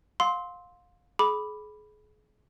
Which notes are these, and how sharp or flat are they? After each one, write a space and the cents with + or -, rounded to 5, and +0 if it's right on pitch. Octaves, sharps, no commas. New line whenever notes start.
F5 +30 C6 +0 E6 -35
G#4 +35 B5 +0 D6 +0